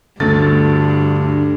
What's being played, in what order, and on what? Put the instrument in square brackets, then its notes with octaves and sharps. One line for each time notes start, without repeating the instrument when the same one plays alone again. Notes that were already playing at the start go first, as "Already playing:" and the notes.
[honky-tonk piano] D2 A3 A6 [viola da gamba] G2 [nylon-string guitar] D3